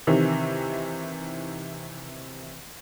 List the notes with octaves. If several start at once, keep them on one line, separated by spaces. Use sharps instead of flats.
C3 D#3 E3 C4